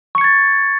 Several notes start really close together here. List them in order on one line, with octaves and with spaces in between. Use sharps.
C#6 C#7 G#6 A6